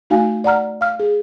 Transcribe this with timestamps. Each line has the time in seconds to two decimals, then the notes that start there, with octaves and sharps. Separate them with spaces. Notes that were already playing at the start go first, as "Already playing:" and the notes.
0.10 A3 D#4 F#4 F5 G#5
0.44 D5 F#5 A#5 F6
0.81 F5 F6
1.00 G#4